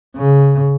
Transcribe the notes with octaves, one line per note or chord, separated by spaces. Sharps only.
C#3